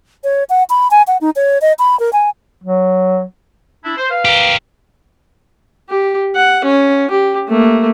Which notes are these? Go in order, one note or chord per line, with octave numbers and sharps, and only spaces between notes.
C#5
F#5
B5
G#5
F#5
D#4
C#5
D#5
B5
A#4
G#5
F#3
D4 E4
C5
B4 F5
G4 A#4
G4
F#5
C#4
G4
A3 A#3